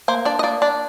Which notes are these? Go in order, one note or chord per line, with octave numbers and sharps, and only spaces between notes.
A#3 C5
D4 D5
D#5
A#3 D5
D4 D5